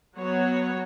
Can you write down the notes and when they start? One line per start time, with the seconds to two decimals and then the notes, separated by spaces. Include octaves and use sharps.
0.17 F#3 B3 F#4 C#5